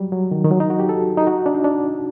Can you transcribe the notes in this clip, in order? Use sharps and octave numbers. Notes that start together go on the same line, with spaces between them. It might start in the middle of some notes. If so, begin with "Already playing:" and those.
Already playing: F#3 G3
F#3
D#3
D#3
F#3
D#4
F#4
G4
A4
D#4
F#4
D4
D#4
D4